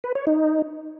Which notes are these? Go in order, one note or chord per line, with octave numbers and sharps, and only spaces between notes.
B4
C#5
D#4